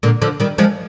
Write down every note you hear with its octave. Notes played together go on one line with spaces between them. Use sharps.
A#2 D3
D3 F3
D#3 G3
F3 G#3